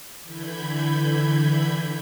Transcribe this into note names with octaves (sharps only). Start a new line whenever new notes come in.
D3 E3 B5 G6 G#6